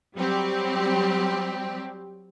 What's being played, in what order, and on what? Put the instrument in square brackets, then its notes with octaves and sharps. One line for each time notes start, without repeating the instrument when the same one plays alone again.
[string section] F#3 G3 C4 G4